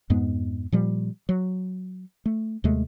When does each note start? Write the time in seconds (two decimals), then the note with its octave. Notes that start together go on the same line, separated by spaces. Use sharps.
0.10 F2 G#2 G#3 B3
0.72 A#2 F3 G3
1.29 F#3
2.26 A3
2.64 D#2 C3 G#3 A3